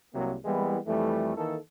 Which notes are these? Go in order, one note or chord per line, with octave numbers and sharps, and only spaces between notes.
C2 C3 F#3 A#3
E3 G3 G#3 A#3 B3 E4
F2 E3 G3 A3
D#3 E3 A#3 A4